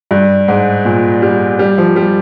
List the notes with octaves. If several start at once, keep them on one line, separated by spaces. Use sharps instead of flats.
G2
G#2
A#2
G3
G3
F3
G3